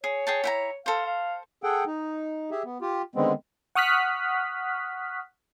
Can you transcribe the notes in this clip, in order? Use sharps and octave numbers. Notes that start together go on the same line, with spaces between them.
G#4 C#5
G#4 G5 A5
E4 G5 A#5
A4 C5 F5
F5
G#4 A4 F#5 G5
D#4
G4 G#4 E5
B3
F4 G4
D3 D#3 G#3 B3 C4
F#5 C#6 D#6 F6 F#6 B6